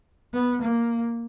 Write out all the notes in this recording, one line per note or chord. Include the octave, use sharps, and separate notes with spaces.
B3
A#3